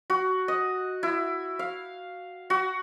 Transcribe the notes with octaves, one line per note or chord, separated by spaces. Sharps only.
F#4
D#5
E4
F5
F#4